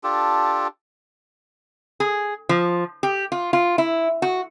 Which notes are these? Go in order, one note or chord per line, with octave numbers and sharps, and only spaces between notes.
D4 F4 G4 A4
G#4
F3
G4
F4
F4
E4
F#4